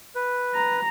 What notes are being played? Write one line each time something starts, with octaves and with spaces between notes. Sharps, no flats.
B4
A#5